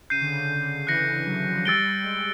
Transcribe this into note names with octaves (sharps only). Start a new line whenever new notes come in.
C#3 G6 C7 D#7
D3
C#3
D3
E3 F#6 A#6 C#7
F#3
F3
F#3
G3 E6 A6 D7 G7
G#3